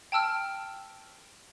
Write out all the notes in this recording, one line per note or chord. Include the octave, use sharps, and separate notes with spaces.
G5 A5 E6 F6